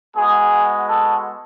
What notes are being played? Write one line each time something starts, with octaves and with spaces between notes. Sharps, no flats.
G#3 B3 F#4 G#4
A4